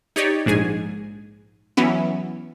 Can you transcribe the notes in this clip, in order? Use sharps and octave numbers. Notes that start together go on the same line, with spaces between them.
D#4 G4 C#5 D5
A#1 G#2 G#4 G#5
E3 F#3 B3 C#4 E4